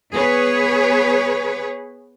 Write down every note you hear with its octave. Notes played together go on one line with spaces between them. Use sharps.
B3 G#4 B4 C#5